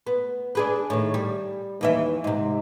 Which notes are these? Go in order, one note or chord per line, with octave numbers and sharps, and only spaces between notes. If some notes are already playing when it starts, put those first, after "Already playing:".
B3
D4 G#4 B4
A2 D#3
G3
D#2 E3 E5
G#2 C3